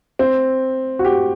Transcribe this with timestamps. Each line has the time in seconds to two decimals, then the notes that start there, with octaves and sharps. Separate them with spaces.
0.19 C4
0.99 F#4
1.05 G4